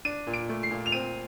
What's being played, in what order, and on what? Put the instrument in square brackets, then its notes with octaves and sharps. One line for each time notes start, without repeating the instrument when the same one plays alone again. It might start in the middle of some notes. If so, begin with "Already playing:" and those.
[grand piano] D4 D#7
A#2
D7
A3
C7
A#2
F7
C4 D#7